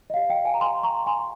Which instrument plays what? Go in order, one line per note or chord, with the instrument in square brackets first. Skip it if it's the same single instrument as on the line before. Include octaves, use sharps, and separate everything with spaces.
[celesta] D#5
G4 C#5 F5
D#5 G5
F5 G#5
A#5
G#5 C6
A#5 C#6
G#5 C6